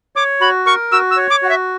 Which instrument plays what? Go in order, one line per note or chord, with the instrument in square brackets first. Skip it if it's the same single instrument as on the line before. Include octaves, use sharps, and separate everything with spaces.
[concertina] C#5 [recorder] D6
[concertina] F#4 [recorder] B5
[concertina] A#4 [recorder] C#6
[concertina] F#4 [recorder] E6
[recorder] E6
[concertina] C#5
[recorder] D6
[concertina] F#4 [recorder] F#5
[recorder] E5